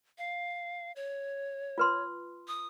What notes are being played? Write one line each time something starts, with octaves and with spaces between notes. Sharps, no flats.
F5
C#5
F4 B4 C6
D#6